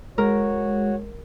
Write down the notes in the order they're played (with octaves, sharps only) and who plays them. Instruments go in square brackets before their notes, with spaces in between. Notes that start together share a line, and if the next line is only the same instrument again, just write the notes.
[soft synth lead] G#3 [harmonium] F#4 C#5 [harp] A#4